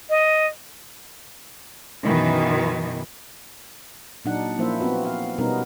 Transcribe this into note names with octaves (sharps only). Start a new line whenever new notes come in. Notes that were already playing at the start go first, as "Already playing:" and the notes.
D#5
F#2 B2 D#3 E3
A#2 F#3 D4 D#4 F#5
F3 A#3 C#4 E4 C5 E5
B3 C4 F4 F#4 B4
F5
B2 G3 B3 C#4 D#4 A#4